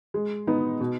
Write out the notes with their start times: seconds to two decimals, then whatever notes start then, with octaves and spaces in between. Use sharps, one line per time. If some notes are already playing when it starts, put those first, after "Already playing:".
0.14 G#3
0.47 B3 D#4
0.80 B2